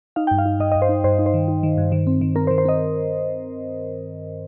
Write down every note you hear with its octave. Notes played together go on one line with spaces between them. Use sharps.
D#4 F5
G5
G2
F5
D#4
G2 D#5
D#5
G2
C5
D#4
G2 C5
D#4
C5
D#3
D#4
D#3
G2
D#3
C4
D#3
C4 A#4
C5
D#3
C5
C4 D#5